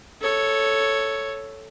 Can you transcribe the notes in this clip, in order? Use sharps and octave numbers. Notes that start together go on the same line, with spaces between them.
A4 C#5